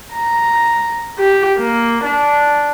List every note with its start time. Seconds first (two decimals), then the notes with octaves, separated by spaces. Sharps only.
0.14 A#5
1.19 G4
1.58 A#3
2.05 D4